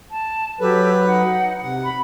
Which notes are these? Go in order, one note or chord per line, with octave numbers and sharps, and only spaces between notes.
A5
F#3 G4 A4 B4 C#5
D#4 F#5
C3 F#5
B5